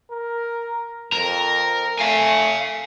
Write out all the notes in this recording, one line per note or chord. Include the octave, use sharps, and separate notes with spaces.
A#4
F2 A#4
A3 F5 G#5